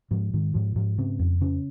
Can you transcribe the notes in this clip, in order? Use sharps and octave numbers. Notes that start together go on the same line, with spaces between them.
G#2 F3
G#2 D#3
G#2 F3
G#2 F3
C#3 C4
F2
C#3 C#4